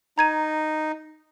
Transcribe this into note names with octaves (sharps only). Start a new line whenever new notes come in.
D#4 A#5 G#6 D#7